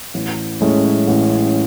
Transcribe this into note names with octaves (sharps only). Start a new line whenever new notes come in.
A1
A2 G#3 C#4
A1